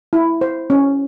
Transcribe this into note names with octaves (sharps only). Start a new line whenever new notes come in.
E4
C5
C#4